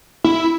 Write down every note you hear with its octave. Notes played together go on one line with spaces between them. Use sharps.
E4